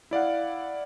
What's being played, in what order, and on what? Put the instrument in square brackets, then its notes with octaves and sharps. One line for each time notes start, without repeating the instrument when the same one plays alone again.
[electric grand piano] E4 D5 F5 F#5